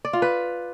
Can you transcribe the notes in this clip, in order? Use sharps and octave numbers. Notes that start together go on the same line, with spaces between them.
D5
F4
B4